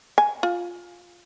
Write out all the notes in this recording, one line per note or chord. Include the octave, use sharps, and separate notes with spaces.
G#5
F4